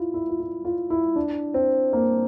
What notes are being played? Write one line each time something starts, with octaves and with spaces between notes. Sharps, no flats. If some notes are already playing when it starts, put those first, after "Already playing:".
Already playing: E4 F4
E4
F4
E4
F4
E4
D4
C4
A#3